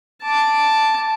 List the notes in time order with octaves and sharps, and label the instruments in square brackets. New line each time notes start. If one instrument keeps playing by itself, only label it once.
[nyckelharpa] A5 D6